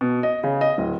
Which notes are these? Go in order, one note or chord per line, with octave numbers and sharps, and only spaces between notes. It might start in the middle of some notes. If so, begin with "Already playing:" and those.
B2
D#5
C#3
D#5
D1